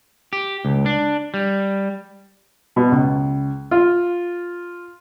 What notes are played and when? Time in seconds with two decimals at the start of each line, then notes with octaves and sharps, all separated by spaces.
0.33 G4
0.65 C#2
0.86 D4
1.34 G3
2.76 B2
2.92 C#2
3.71 F4